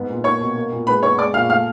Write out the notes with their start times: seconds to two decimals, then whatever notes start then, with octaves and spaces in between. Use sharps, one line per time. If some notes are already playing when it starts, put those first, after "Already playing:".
Already playing: G#2 B3
0.10 A#2
0.24 A#3 C#5 C#6
0.40 B2
0.56 A#3
0.72 A#2
0.87 G#3 B4 B5
1.03 B3 C#5 C#6
1.19 G#3 D5 D6
1.34 A#2 F5 F6
1.49 A3 F5 F6